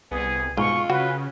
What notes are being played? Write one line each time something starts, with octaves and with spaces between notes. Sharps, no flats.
C2 B3 G#4
G#2 B2 F4 C#6
C#3 F#4 B4